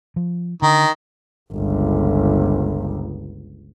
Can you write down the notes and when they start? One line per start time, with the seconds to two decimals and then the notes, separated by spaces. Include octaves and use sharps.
0.16 F3
0.62 D3 D#3
1.53 G1 C#2